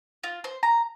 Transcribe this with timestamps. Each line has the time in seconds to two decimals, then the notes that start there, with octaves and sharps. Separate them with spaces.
0.24 F4
0.44 C5
0.63 A#5